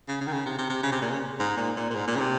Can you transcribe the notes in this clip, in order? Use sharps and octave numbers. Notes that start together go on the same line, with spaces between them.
C#3
C#3
D#3
C#3
C3
C3
C3
C#3
C3
A#2
C#3
G#2
A#2
A#2
A#2
G#2
A#2
C#3
C3